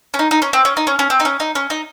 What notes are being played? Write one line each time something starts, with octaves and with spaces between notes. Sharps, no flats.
C#4
D#4
D#4
C#4
C4
C#4
D#4
C#4
C#4
C4
D#4
C#4
D#4
C#4
D#4